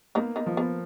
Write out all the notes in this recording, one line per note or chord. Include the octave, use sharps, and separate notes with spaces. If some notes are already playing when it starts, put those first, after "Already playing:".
A#3 B3 D#4
B3 D#4
F3
B3